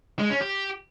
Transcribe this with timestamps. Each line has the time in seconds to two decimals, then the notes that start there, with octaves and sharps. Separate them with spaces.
0.19 G#3
0.30 C#4
0.41 G4